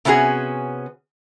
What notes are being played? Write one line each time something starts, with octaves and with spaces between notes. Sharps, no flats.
C3 B3 C#4 F#4 G#4